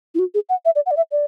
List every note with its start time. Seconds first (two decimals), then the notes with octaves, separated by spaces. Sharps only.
0.15 E4
0.19 F#4
0.34 G#4
0.49 F#5
0.65 E5
0.75 D5
0.86 F#5
0.91 D5
0.97 E5
1.12 D5